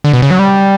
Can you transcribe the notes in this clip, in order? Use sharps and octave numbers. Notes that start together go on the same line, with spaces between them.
D3
B2
C#3
F#3
G3